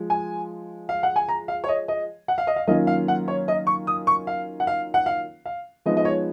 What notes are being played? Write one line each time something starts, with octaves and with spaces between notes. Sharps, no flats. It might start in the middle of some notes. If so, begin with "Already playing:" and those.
Already playing: F3 G#3
G#5
F5
F#5
G#5
A#5
F5
C#5
D#5
D#5
F#5
F5
D#5
F5
D#3 F#3 A#3 C#4 F4 D#5
F5
F#5
C#5
D#5
C#6
D#6
C#6
F5
F#5
F5
F#5
F5
F5
F3 G#3 B3 D#4 D#5
D#5
C#5